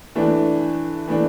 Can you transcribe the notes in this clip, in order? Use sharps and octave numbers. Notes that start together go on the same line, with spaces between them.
E3 A3 D4
E3 A3 D4